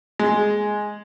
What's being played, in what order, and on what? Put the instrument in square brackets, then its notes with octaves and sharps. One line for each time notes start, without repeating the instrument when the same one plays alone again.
[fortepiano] G#3